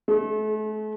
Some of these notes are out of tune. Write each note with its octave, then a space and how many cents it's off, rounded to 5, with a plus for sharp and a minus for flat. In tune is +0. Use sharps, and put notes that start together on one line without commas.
A3 -40